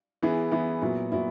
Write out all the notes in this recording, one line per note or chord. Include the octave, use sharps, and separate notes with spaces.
E3 B3 E4 G#4
E3 B3 E4 G#4
A#2 F#3 B3 E4
A#2 F#3 B3 E4